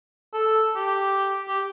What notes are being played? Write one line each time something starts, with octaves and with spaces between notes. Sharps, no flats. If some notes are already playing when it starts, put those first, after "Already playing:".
A4
G4
G4